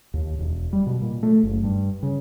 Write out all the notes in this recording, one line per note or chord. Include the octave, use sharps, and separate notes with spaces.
D#2
E1
G3
B2
A#2
A3
F#1
G2
C#3